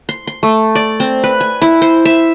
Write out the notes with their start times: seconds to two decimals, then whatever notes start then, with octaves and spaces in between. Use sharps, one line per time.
0.09 C6
0.27 C6
0.43 A3
0.75 D5
1.00 C4
1.24 B4
1.41 G#5
1.62 E4
1.82 C5
2.05 E5